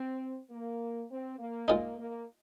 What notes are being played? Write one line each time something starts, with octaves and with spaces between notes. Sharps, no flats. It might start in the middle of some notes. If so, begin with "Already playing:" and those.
Already playing: C4
A#3
C4
A#3
A#2 G#3 A#3 D#4
A#3